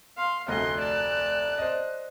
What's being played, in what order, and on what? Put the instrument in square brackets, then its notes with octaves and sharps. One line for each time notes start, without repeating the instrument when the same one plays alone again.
[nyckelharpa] F5 [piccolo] C6
[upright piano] F1 D2 [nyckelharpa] D#5 C6 [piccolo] F#6
[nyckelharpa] D5 A5
[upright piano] C5 D#5